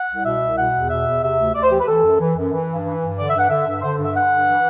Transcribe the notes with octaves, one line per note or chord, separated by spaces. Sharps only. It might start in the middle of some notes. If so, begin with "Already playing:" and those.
Already playing: F#5
C2
B2 E5
C2
B2 F#5
E2
B2 E5
E2
C3 E5
D2
D2 D5
C5
E3 G4
B4
E3 A4
F#2
E3
F#2
E3
G2
E3
G2
D3 D5
G2 E5
F#5
D3 E5
G2
D3 C5
G2
E5
D3 F#5
G2
E3